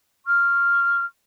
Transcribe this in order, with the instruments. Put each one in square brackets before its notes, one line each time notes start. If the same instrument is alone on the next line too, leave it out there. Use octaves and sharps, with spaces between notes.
[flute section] C#6 F6